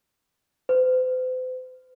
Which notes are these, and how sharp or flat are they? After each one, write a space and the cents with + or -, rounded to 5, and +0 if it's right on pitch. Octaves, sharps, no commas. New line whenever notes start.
C5 -45